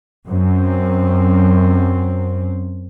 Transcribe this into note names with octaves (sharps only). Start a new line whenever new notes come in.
F#2 C4